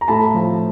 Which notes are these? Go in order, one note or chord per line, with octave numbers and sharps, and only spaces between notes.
A#5
A2 A5 B5
F3